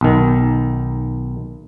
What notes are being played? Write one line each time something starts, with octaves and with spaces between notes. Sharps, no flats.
B1 D#3